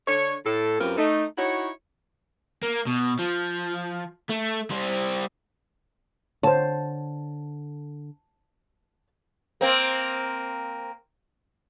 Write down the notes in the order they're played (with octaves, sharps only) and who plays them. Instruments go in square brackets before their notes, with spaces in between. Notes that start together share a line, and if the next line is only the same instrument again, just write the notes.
[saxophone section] D3 C#5
A2 A4
F#2 C4 F4 G4 A#4 B4
A3 D#4
D#4 E4 F#4 C#5
[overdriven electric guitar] A#3
B2
F3
A3
G3 C5
[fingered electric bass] D3 [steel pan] C5 C#5 [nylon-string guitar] A5
[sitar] A#3 C4